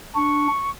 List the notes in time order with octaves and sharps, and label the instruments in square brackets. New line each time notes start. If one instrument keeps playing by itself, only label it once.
[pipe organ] D4 [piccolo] C#6